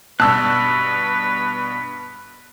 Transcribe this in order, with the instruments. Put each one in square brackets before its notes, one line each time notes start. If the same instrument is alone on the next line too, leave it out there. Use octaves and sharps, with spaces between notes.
[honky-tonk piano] G2 B2 [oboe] B4 [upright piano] A5 E6 [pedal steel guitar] B5 F#6